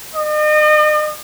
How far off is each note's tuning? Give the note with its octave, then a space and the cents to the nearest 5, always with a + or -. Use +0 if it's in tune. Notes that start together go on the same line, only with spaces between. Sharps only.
D#5 -40